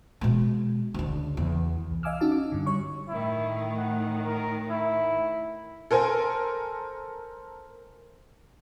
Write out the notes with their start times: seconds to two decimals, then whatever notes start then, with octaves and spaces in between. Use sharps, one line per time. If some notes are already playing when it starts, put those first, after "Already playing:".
0.21 B2 G#3
0.94 D2 C#3
1.37 E2
1.90 C2
2.03 D#5 F5 G#5 D6 E6 F6
2.21 C#4 D#4 F#4 A5
2.32 D6
2.52 G2 D3
2.66 G3 C#5 C#6
3.09 A2 D#3 E4
3.78 F#5
4.24 A#4
4.70 E4
5.91 A4 A#4 C5 G#5